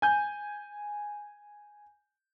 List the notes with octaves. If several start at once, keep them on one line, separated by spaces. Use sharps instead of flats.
G#5 G6